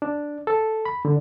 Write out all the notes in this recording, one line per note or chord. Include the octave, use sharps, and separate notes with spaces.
D4
A4
B5
D3